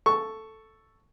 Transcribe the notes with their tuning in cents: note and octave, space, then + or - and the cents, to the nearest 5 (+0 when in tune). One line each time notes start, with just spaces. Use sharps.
A4 +0 C#6 +0